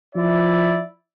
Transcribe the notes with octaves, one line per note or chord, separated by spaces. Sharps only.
F3 E4 D5 E5